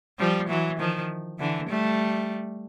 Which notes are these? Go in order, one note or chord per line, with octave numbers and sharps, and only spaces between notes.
F3 G3
E3 F#3
D#3 F3
D3 E3
G3 A3